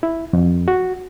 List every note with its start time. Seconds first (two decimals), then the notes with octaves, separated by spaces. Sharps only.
0.03 E4
0.33 F2
0.68 F#4